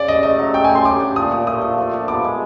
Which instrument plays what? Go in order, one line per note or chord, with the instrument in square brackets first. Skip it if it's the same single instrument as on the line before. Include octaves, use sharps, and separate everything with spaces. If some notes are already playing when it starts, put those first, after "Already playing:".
Already playing: [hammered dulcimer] C#3 [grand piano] D5
[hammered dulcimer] C#4 [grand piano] D#5
[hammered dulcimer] A3 [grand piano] D#5
[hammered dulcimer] F#3
[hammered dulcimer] A3 [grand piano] G5
[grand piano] G#5
[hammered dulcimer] A3 [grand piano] C6
[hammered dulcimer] G4 [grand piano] D6
[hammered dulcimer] D4
[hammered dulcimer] A#2 [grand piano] D#6
[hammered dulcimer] A#2
[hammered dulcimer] A3 [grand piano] D#6
[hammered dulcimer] F3
F3
D4
[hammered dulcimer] B3 [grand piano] D6
[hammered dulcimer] G#3